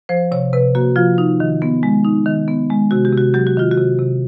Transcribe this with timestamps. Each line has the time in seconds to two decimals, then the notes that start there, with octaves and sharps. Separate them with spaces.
0.09 F3 C5
0.32 C3 C#5
0.53 C3 B4
0.75 A#3 F#4
0.96 F3 F4
1.18 D#4
1.40 D#3
1.62 B3
1.83 G#3
2.05 D#4
2.26 D#3
2.48 B3
2.70 G#3
2.91 C3 F#4
3.05 G4
3.13 C3 F#4
3.34 F#3 G4
3.47 F#4
3.57 D#3 F4
3.71 F#4
3.78 C3
3.99 C3